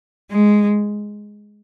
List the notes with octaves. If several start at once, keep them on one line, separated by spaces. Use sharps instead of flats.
G#3